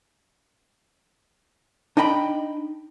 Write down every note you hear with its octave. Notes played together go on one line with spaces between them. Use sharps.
D4 D#4 D#5 G5 B5